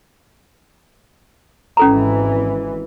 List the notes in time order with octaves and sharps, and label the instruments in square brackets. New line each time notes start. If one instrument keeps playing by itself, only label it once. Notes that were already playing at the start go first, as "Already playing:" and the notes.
[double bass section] G#1 E3 [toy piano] C#4 A4 A#5